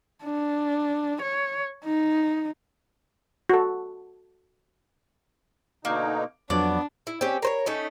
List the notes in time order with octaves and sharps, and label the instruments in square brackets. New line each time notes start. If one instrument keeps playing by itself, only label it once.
[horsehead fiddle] D4
C#5
D#4
[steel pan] F#4 A4
[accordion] B2 D3 D#4 [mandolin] A#3
[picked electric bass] F2 F#3 [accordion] B3 [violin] D4 [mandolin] D5
[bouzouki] E4
C4 C#4 G4
A#4 C5 C#5
A3 C#4 D#4